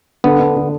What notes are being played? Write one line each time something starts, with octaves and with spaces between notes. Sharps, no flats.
D3 B3
D4
D3